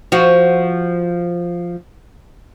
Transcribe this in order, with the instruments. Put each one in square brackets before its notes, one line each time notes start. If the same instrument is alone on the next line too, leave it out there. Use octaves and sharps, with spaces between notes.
[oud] F3 F#4